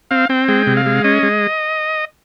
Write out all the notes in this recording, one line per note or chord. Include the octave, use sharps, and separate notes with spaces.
C4 F5
C4 G5
G#3 G5
C3
F5
G#3
C#4 D#5
G#3